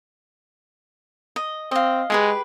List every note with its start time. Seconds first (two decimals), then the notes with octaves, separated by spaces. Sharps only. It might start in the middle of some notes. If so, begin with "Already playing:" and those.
1.36 D#5
1.71 C4 D#5 F5
2.10 G#3 G4 G#4 B4